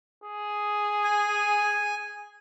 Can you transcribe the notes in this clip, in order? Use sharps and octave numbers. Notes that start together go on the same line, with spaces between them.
G#4
G#5